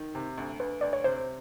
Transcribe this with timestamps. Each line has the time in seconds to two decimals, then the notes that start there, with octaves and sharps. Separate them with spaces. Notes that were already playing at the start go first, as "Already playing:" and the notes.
Already playing: D#3
0.15 C3
0.38 D2
0.60 D2 B4
0.81 D2 D5
0.93 C#5
1.04 C3 C5